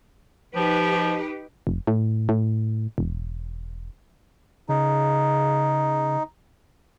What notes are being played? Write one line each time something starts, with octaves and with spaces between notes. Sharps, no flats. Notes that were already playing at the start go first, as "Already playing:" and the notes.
F3 D#4 G4 B4
F1
A2
A2
E1
C#3 D#4